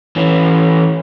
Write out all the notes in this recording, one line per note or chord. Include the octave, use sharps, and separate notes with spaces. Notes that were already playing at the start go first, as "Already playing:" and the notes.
E3 C#4